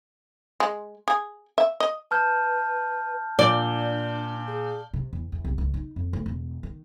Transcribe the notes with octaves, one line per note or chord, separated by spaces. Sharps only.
G#3
G#4
E5
D#5
B4 A5 F6 G6
A#2 D4 D5 G7
G#4
C3
E2
E2
C2
C#2
D#4
F2
D2
E1
D#3